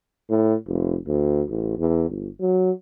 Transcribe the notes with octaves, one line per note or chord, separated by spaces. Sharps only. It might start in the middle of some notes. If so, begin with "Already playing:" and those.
A2
F1
D2
A1
E2
G1
F#3